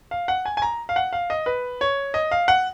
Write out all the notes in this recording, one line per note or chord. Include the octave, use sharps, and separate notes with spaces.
F5
F#5
G#5
G#5
A#5
F5
F#5
F5
D#5
B4
C#5
D#5
F5
F#5